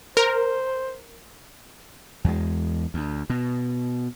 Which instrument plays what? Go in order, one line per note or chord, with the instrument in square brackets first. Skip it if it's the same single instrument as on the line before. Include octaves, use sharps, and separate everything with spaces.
[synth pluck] A#4 [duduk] C5
[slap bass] E2 G#3
D2
B2